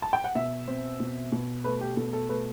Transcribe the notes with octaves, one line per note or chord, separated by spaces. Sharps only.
A5
G5
F#5
B2 E5
C4
B2
B2
A3 B4
G4
B2 A4
A4
A3 B4